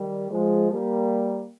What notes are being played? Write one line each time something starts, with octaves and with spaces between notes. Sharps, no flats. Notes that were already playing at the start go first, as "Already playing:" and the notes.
Already playing: D#3 G3
F3 G#3
G3 A#3